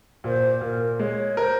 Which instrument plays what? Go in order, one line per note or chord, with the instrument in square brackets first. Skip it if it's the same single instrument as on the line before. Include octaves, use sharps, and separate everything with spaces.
[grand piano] A#2 [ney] C5
[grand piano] A#2 [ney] A#4
[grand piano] G#3 [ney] C#5
[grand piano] A#4 [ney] C5